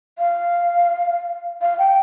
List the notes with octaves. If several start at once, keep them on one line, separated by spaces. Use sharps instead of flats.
F5
F5
G5